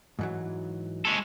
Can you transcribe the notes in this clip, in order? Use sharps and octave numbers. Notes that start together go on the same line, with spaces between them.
G#2 E3 F#3
G#3 A4